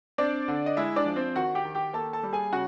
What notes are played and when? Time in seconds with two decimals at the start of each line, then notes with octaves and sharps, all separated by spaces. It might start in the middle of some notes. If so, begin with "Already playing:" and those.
0.18 C4 D4 D5
0.48 D3
0.66 D#5
0.77 G#3 E4 E5
0.96 D4 D5
1.06 F3
1.16 C4 C5
1.35 D#3 F#4 F#5
1.55 G4 G5
1.65 D#3
1.75 G4 G5
1.93 A#3 A4 A5
2.13 A4 A5
2.23 G3
2.33 G#4 G#5
2.52 C#3 F#4 F#5